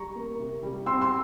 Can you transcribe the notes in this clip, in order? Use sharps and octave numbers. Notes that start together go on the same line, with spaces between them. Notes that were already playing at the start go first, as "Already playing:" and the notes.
Already playing: G3 A#5 C#6
A#3
C3
G3
C4 C6 E6
C6 E6